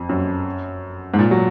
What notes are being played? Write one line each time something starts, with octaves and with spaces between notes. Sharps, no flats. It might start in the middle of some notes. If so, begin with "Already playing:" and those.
Already playing: F2
F#2
G#2
A#2
F#3